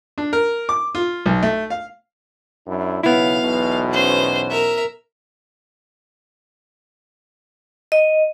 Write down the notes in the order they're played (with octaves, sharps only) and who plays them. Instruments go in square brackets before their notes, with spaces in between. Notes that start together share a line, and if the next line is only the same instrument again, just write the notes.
[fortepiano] D4
A#4
D6
F4
B1
A3
F5
[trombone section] F#2 D4 E4
[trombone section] B1 C#3 [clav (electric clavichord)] B3 E4 [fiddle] F5
[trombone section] B1 E2 B2
[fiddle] C#4 C5
A#4 E5
[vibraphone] D#5